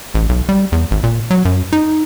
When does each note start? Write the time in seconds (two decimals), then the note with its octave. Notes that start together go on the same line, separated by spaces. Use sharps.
0.15 A1
0.29 B1
0.49 G3
0.72 E2
0.91 G#1
1.04 A#2
1.31 F#3
1.45 F#2
1.73 D#4